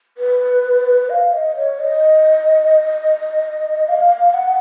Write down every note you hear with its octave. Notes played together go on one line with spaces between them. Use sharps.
B4
F5
D#5
C#5
D#5
F5
F#5